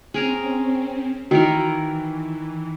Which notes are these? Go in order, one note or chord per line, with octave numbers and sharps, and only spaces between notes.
C4 C#4 G#4 A#4 A#5
D#3 E3 E4 F#4 A#4